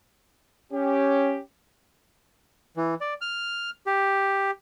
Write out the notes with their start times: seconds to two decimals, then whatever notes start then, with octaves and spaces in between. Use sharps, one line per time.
0.72 C#4 G4
2.77 E3
3.01 D5
3.21 F6
3.86 G4